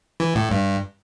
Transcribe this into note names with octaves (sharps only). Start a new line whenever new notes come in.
E3
A2
G2